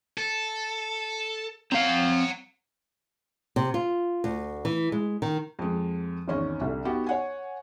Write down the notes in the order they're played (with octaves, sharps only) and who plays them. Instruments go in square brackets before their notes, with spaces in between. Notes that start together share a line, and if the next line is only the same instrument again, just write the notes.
[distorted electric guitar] A4
[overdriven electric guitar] C4 F5 [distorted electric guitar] F#5 A#5
[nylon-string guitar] C3
F4
D2
E3
G#3
D#3
[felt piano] F2 G#3
G#1 E2 C#4 D#4
C2 D3
B3 D#4 F#4 G4
C#5 F#5 G#5